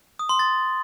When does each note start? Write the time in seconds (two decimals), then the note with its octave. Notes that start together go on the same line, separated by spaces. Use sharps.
0.19 D#6
0.29 C6
0.39 A6